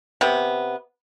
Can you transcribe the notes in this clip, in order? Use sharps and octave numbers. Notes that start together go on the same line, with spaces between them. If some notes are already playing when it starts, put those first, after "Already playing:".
C3 B3